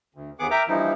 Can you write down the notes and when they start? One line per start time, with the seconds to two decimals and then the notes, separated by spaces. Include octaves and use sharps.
0.15 D2
0.39 D#2 B3 G#4 F#5 D6
0.51 A#4 E5 G5 A#5 D6
0.68 G2 E3 F3 A#3 D#4 E4